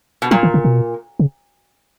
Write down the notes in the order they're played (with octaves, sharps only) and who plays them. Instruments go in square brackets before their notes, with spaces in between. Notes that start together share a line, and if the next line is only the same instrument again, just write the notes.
[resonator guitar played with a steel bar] B2
[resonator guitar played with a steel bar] A#2 [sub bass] F#3
[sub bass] D#3
C#3
B2
C#3